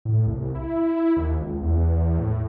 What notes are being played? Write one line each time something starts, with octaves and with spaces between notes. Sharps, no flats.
A2
C2
E4
D#2
C#2
E2
A2